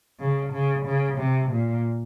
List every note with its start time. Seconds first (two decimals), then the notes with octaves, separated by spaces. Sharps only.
0.19 C#3
0.53 C#3
0.85 C#3
1.18 C3
1.51 A#2